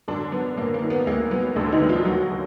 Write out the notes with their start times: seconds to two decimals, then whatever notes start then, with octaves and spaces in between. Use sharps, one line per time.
0.08 F#2 D3 D4
0.32 F#3 B3
0.57 F#2 A#3
0.74 A#3
0.82 D#3
0.90 B3
1.07 D2 A#3
1.31 F#3 B3
1.56 D2 D3 D4
1.72 D#3 D#4
1.81 D2
1.89 F3 F4
2.05 D#2 F#3 F#4
2.30 D3